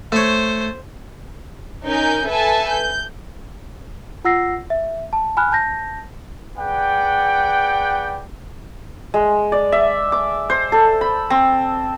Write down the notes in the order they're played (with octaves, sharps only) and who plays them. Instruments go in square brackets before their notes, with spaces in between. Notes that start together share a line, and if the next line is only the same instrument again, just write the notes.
[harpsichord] A3 C#5 [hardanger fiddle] C5
[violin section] C#4 D#4 A#4 G#5 G6
A4 B4 E5 G#5 A5
G6
[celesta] F4 F#5 E6 A#6 C7
E5
A5
G#5 B5 F6 F#6
A5 G6 A#6
[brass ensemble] G#4 B4 D5 F#5 G5
[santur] G#3
D5
E5
D6
C5
A4
B5
C4